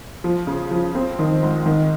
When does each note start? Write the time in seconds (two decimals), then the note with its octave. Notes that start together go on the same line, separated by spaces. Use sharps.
0.24 F3
0.47 C#3
0.71 F3
0.95 C4
1.19 D#3
1.43 G#2
1.66 D#3